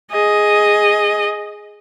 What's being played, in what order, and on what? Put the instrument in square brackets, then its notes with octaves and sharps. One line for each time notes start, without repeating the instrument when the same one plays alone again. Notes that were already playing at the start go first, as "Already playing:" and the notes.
[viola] G#4 D#5